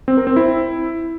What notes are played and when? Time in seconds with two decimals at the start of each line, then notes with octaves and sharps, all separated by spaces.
0.08 C4
0.17 A#4
0.27 C4
0.36 E4